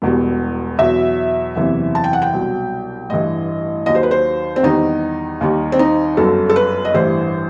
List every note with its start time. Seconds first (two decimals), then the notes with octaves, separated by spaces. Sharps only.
0.02 E1 E2 B2 G3
0.79 E2 B2 F#3 E5
1.56 F#1 E2 C3 E3
1.95 A5
2.04 G5
2.13 F#5
2.22 G5
2.33 C2 B2 F#3
3.09 A1 G2 E3 D#5
3.86 D#2 D#3 F#3 D#5
3.95 C5
4.03 B4
4.11 C5
4.56 C4
4.63 E2 D#3 G3 D#4
5.41 D#2 D#3 G3
5.72 C4
5.79 D#4
6.17 G1 F#2 F#3 A4
6.49 A4
6.56 B4
6.85 D#5
6.94 A1 G2 E3 G3 C5